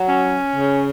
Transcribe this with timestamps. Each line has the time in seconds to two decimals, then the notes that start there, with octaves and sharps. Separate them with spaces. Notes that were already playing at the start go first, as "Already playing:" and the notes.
Already playing: F#3
0.09 C#4
0.56 C#3